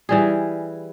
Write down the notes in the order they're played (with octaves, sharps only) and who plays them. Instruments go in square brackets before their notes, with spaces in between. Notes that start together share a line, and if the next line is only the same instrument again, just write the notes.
[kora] E3 G3 G#4